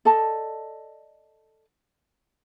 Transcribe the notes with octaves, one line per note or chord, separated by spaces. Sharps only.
A4 D5 D#5 A5